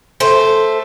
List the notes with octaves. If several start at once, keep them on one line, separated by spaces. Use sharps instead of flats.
A3 C5